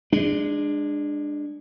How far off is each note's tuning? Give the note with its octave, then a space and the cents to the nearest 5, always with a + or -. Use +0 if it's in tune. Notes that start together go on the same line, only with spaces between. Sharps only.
G#3 -15 D4 +15